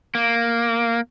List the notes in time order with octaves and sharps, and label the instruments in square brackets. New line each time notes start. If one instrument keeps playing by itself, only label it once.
[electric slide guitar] A#3